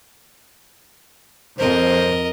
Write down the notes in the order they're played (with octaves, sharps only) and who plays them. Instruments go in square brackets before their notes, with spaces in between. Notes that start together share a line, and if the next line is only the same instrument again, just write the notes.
[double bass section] F2 [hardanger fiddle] A#4 D#5 [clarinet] C5